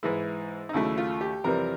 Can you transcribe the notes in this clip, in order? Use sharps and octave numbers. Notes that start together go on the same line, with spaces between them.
G#2 E3 G#3 E4
D#4
D#2 C#3 F#3 A3 E4
F4
G4
F2 C3 E3 G3 A#4